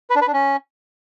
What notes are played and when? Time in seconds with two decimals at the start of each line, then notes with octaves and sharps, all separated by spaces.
0.10 B4
0.16 D4
0.22 B4
0.27 D4
0.33 C#4